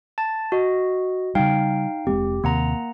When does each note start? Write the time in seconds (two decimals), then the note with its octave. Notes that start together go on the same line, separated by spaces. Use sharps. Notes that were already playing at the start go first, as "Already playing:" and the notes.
0.18 A5 A6
0.52 F#4 D#5
1.35 C#3 G3 D#4 F5 G5
2.07 F1 G#3 C4 G4
2.44 D#2 C3 A#3 F#5 A#5